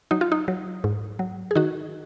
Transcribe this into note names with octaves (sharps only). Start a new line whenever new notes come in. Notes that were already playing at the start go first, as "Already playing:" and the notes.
F#3 D#4
F4
D#4
F#3
G#2
F#3
G#4
D#3 D#4 F#4